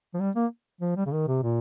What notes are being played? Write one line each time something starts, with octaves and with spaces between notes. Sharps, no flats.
F3
G3
A#3
F3
G3
C#3
D#3
C3
A#2